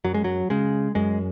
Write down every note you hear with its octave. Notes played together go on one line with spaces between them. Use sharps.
F#2 F#3
G#3
F#3
C#3 G#3
F#2 G#3